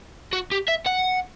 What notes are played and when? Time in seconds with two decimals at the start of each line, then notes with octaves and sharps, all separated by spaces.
0.33 F#4
0.52 G4
0.68 E5
0.86 F#5